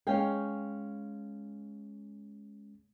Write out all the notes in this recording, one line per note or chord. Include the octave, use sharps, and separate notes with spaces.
G#3 C#4 F5 G5